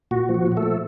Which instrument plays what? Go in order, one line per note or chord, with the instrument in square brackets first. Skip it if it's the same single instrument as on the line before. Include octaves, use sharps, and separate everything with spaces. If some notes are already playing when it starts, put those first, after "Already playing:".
[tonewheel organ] A#2 F#4
F3
F#4
A#2
F#4
A3 A4
F3